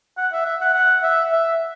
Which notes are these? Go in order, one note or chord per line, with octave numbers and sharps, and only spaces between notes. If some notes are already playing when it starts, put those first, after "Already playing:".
F#5
E5
E5
F#5
F#5
E5
E5